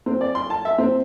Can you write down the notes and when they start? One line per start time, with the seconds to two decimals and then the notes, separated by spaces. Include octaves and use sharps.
0.06 C4
0.21 D5
0.35 C6
0.50 A5
0.65 E5
0.78 C4